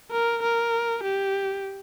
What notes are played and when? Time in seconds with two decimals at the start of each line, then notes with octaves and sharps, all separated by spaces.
0.11 A#4
0.43 A#4
1.04 G4